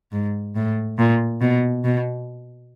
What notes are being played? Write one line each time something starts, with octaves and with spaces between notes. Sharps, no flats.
G#2
A2
A#2
B2
B2